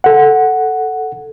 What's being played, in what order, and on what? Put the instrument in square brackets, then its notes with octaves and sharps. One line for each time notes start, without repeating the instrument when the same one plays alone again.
[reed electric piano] A4 F#5